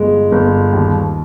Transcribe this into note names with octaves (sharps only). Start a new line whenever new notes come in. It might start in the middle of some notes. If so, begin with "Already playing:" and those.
Already playing: G1 G#3
G1
D#2